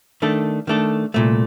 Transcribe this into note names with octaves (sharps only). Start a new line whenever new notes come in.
D#3 A3 D4 A4
D#3 A3 D4 A4
C2 A#2 A3